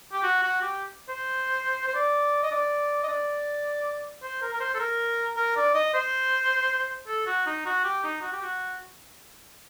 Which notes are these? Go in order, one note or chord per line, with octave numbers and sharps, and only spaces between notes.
G4
F#4
F#4
G4
C5
C5
D5
D#5
D5
D#5
D5
C5
A#4
A#4
C5
A4
A#4
A#4
D5
D#5
C5
A4
F#4
D#4
F#4
G4
D#4
F#4
G4
F#4